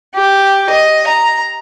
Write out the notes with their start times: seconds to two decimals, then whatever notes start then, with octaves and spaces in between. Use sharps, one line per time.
0.15 G4
0.69 D#5
1.07 A#5